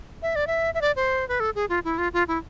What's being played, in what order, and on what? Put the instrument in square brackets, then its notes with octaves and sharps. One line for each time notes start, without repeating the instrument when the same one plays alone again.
[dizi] E5
D5
E5
E5
D5
C5
B4
A4
G#4
F4
E4
F4
F4
E4